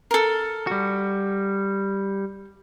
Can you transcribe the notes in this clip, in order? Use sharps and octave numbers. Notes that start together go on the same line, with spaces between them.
A4 A#4
G3 F#4